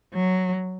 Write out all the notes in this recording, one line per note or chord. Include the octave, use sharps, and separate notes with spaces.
F#3